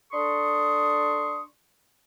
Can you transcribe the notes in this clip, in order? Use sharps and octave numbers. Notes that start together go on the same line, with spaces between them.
D4 A4 C6 C#6 D#6